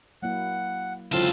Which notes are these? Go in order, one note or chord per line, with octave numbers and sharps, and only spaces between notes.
F#3 A#3 E4 F#5
C#2 D3 F#3 C4 E4 F4 A4 F5